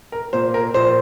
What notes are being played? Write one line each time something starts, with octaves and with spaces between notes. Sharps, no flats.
A#4
A#2 A#3 C5
A#4
A#1 C5